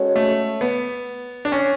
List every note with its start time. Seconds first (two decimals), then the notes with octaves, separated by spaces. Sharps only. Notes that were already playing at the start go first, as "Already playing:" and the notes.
Already playing: G#3 C#4 F#4 A4 C#5
0.16 A3
0.61 B3
1.45 D4
1.52 C#4